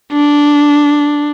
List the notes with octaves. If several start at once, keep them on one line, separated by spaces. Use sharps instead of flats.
D4